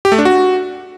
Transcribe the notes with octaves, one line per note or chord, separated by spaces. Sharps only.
G4
A3
D4
F#4